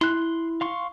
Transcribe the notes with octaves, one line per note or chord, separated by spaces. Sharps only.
E4 C6 F#6
F5 C6 C#6